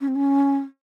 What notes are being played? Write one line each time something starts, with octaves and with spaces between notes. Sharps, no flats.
C#4
C4
C#4